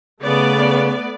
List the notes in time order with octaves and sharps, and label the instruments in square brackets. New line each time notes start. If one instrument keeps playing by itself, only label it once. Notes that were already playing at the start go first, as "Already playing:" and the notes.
[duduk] C#3 [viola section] A3 B3 D5